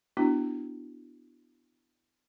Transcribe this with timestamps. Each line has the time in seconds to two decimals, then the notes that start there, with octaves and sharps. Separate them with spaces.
0.17 B3 D4 E4 F#4